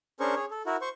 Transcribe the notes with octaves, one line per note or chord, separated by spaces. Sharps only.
C#4 D4 G#4 A#4 C5 C#6
G#4 C#5
A4
E4 F#4 A#4
C5 C#6